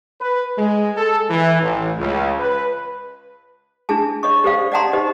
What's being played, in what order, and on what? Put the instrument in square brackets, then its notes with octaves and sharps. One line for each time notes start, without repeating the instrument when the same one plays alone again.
[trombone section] B4
G#3
A4
E3
A1
C#2
B4
[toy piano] D4 E4 G#4 A5
C#5 D#5 C#6
G4 A4 C5 D5 F5
D5 D#5 F#5 A5 A#5 C6
D#4 G4 C5 D#5